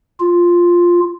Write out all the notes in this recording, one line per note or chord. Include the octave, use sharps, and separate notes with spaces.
F4